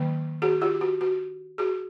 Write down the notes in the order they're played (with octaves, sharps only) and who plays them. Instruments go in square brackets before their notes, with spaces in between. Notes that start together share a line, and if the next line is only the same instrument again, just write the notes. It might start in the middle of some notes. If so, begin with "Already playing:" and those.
Already playing: [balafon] D#3 F#3 A#3
F#4 G#4
F4 G4
F#4
F#4
F#4 G#4